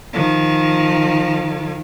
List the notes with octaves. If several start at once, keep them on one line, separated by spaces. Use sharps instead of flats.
D#3 F3